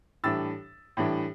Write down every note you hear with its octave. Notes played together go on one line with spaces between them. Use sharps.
A2 E3 G3 D4 E6 A6
A2 E3 G3 D4